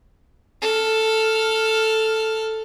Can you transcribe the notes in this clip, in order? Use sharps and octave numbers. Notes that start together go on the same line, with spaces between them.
A4 F6